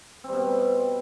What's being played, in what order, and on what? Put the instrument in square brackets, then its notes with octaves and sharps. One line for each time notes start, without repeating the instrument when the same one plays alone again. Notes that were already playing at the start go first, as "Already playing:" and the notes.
[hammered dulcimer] C4
G3
B2